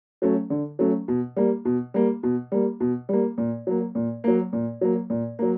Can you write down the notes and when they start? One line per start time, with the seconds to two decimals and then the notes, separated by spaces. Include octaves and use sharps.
0.22 F#3 A3 C#4
0.50 D3
0.79 F#3 A3 C#4
1.08 B2
1.36 G3 A#3
1.65 B2
1.94 G3 A#3
2.23 B2
2.52 G3 A#3
2.80 B2
3.09 G3 A#3
3.38 A#2
3.67 F#3 A#3
3.95 A#2
4.24 F#3 A#3
4.53 A#2
4.81 F#3 A#3
5.10 A#2
5.39 F#3 A#3